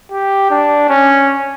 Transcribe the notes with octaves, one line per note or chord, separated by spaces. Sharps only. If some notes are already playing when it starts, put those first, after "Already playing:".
G4
D4
C#4